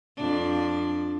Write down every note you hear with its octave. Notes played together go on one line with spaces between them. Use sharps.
F2 D4